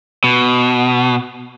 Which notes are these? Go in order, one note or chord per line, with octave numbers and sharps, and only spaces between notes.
B2